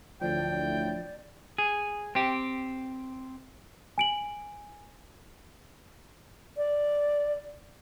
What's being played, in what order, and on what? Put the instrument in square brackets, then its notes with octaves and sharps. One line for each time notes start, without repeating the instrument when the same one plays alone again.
[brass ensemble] D2 A2 [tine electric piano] F3 [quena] D5 [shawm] G5
[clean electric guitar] G#4
C4 G4
[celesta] G#5 D7 F#7
[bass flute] D5